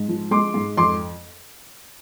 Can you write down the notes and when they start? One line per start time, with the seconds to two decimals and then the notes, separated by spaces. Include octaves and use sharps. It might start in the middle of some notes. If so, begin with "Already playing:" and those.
Already playing: G#2
0.08 F3
0.31 G#3 C6 D6
0.54 G#2
0.77 F2 C6 D6